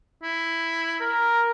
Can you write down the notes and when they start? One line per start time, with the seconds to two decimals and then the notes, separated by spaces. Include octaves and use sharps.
0.23 E4
1.01 A#4